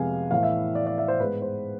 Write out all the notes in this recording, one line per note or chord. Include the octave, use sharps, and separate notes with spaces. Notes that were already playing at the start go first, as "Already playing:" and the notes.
Already playing: F2 C3 G#3 B3 F5 G#5
A2 E3 B3 F5
E5
D5
D5
E5
C5
G#2 G#3 B3 B4
C5